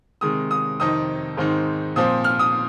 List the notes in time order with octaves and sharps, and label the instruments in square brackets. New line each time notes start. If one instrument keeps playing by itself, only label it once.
[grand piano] C3 D#3 G#3 D#6
D#6
F2 C3 D#3 C4 D#4 D#6
G#2 D#3 C4 D#4
A#2 F3 C4 D#6
F6
D#6